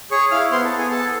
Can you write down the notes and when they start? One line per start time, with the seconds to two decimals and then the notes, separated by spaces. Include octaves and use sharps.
0.11 G#4 C#5 C#6
0.31 E4 F5 F6
0.51 B3 C5 C6
0.65 A4 A5
0.71 B3
0.78 G#4 G#5
0.91 A4 A5